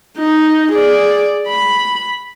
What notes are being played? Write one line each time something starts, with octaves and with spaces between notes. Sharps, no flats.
D#4
G#4 D5
B5